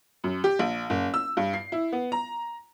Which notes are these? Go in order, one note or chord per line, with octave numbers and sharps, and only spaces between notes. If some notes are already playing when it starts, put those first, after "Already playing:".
F#2
G4
A#1
F#1
E6
G2
C7
E4
B3
A#5